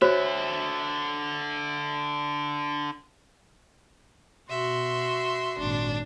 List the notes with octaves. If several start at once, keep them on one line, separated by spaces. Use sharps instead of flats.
D3 F#4 C5 C#5 E5
B2 F#4 E5 C6
G#1 A#2 D4